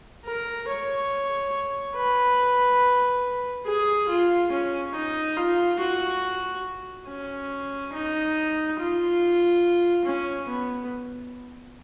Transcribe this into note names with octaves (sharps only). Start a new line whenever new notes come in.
A#4
C#5
B4
G#4
F4
C#4
D#4
F4
F#4
C#4
D#4
F4
C#4
B3